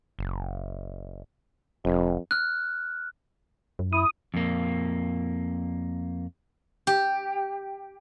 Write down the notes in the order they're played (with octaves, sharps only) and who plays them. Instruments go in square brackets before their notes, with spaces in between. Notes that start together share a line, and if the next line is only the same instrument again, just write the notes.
[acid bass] F#1
[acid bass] F1 [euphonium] F2
[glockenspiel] F6 F#6
[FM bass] F#2
[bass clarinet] E4 [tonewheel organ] D#6
[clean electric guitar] F2 A#3
[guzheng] G4